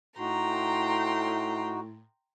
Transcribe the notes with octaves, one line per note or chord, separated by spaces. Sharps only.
A2 D#4 F#4 G5 A#5 C6